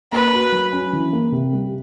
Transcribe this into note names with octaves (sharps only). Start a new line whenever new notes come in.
A#3 B4
F#4
F#3
C#4
E3
A#3
C3
G3